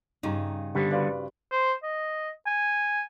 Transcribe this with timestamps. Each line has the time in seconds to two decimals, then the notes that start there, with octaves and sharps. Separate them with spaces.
0.23 G2 C#3 C#4 D#4 F4 A#5
0.75 D3 G3 B3 G4 C5
0.91 F#4 B4 C5 D5 F5
1.52 C5
1.83 D#5
2.47 G#5